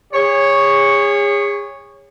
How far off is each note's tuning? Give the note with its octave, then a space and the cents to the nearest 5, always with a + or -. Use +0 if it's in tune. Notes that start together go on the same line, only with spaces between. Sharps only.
G#4 -35 C#5 +0